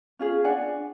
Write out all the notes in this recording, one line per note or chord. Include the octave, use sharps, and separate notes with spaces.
C#4 F4 G#4
D4 D5 F#5 G#5